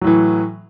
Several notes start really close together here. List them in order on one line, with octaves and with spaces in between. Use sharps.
F#3 A2 E3